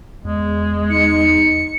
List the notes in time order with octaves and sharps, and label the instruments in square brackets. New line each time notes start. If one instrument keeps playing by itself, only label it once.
[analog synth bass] E2 [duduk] G#3
[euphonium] D#4 [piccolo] C#7